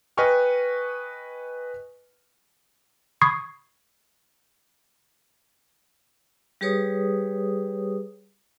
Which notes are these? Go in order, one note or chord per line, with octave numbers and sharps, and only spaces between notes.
B4 D#5 G5 G#5 C#6 F6
B5 C#6 D#6 G#6 C7
G3 G4 G#4 B4 C#5 D#6